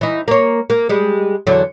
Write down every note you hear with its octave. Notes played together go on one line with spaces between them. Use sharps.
E3 D#4
A#3 C#5
A#3
G3 G#3
E2 D3 F#3